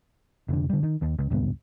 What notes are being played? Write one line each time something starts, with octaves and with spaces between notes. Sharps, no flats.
F1 D3
D3 G3
D#3
D#2
C#2
D#1 C#2 G2 B3